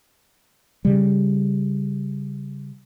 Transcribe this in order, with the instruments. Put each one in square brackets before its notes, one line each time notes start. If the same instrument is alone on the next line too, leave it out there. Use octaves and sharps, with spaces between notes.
[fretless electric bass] C#3 G3